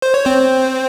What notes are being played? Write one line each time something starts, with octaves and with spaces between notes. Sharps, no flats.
C5
C#5
C4 C5